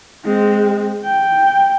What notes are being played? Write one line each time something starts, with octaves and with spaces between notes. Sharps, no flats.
G#3 C4
G5